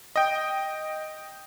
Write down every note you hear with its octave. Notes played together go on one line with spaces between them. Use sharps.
D#5 G5